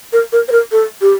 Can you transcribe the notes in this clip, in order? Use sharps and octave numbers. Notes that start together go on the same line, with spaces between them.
A#4
A#4
C5
A#4
A4
G4